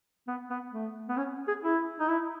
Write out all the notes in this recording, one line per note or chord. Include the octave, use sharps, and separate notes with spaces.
B3
B3
A3
B3
C#4
G#4
E4
D#4
E4